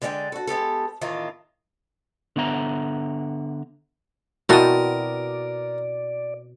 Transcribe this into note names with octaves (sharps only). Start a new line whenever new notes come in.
D3 G#3 D5 D#5 G5
F#4 A4
G#3 B3 G4 A4
E2 A2 D#3 E3 F4
D3 B3 E5 A#5
B2 C4 E4 F#4 A#4 D5 A5 D#6